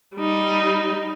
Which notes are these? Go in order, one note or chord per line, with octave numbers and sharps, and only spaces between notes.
G3 D#4